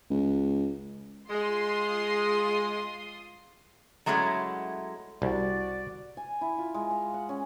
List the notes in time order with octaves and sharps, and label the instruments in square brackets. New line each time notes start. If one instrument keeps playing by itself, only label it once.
[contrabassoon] C#2
[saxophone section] G#3 [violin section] F4 C6 D#6
[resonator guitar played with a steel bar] F#3 G#3 A3 C#4 E4 F#5
[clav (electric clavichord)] C2 [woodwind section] F#4 D5
[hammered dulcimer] G#5
E4
F4
G#3
F5
F#5
C#4